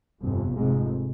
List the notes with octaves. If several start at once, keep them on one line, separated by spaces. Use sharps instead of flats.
G1 F2 C3
F1 F2 G#2 C3 G#3